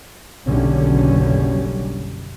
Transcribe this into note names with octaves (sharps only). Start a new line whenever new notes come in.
F#1 B1 F#2 D3 G3 C#4